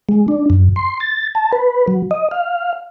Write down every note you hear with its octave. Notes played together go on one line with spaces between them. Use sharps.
G#3
D4
F#2
C6
A6
A5
B4
F#3
D#5
F5